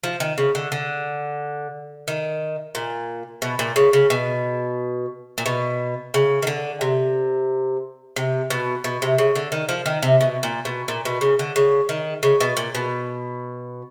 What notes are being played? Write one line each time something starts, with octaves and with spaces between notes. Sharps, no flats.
F3
D#3
C#3
D3
D3
D#3
A#2
B2
A#2
C#3
C#3
B2
A#2
B2
C#3
D#3
D3
C3
C3
B2
B2
C3
C#3
D3
D#3
F3
D#3
C3
B2
A#2
B2
A#2
B2
C#3
D3
C#3
D#3
C#3
B2
A#2
B2